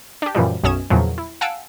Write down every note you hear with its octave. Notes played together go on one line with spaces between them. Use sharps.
D4 G4
F#2 A#2 E3 F3 G3
B1 F#2 C#4 D#6 G#6 E7
E2 A#2 C#3 F3 F#3
E4
F5 F#5 G#5 A5 E6 D7